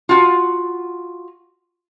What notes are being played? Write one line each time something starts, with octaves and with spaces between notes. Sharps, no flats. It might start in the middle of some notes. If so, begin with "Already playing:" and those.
F4 F#4